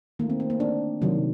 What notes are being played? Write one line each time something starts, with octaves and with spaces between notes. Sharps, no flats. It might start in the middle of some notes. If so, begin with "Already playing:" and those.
D#3 A3 A#3
C4
C4
A#3
D4
C3 D#3 F#3